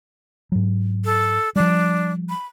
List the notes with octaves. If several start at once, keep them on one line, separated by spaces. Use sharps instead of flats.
G#2 F#3
A4
F3 G3 D4
B5